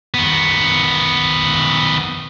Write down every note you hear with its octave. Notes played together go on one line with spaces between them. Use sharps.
D#3 B3